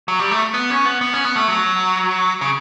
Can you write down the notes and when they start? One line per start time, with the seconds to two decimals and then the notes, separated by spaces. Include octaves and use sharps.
0.08 F#3
0.19 G3
0.31 A3
0.54 B3
0.70 C#4
0.85 B3
1.01 B3
1.13 C#4
1.25 B3
1.36 A3
1.48 F#3
2.41 C#3